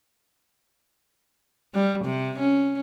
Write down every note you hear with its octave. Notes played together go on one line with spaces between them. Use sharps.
G3
C3
C#4